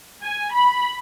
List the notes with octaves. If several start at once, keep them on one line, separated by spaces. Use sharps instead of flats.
G#5
B5